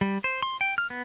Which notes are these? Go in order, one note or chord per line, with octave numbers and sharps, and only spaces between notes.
G3
C5
C6
G5
F6
B3